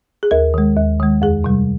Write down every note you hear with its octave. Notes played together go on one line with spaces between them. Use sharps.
G#4
D#2 A#4
D#3 G#3
D#2
D#3 G#3
F2 G#4
C3 G3